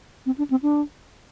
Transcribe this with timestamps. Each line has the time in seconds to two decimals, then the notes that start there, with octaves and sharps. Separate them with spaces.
0.26 C4
0.38 D4
0.50 C4
0.63 D4